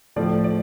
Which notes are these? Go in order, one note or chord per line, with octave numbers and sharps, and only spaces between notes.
A2 F3 A3 D5
D5